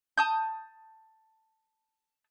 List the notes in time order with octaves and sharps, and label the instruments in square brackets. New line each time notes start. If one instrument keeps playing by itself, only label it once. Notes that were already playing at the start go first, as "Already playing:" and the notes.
[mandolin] A5 D#6 G6